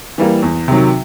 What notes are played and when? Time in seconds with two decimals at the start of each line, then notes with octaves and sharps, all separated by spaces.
0.18 E3 G3 A#3
0.43 E2
0.68 C3 D#3 F#3